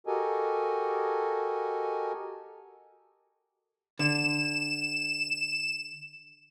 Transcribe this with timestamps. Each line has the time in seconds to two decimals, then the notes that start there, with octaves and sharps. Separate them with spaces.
0.07 F#4 G4 A4 A#4 D#5 G#5
3.99 D3 E7